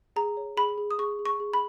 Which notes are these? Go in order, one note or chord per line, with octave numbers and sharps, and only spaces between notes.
G#4 A#5
C#5
G#4 B5
G#4
D#6
G#4 C#6
G#4
C#6
G#4
B5